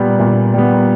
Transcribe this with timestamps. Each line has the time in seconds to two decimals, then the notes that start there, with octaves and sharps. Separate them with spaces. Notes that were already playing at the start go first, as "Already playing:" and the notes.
Already playing: A#2 G3 B3
0.19 A#2
0.54 G3 B3